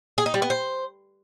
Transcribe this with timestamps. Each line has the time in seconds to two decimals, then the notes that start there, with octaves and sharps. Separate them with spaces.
0.18 G#4
0.26 D#4
0.34 G3
0.42 B3
0.50 C5